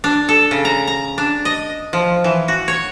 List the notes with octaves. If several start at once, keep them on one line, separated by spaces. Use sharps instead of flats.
D4
A4
C#3
A#5
A#5
D4
D#5
F3
E3
F#4
C#5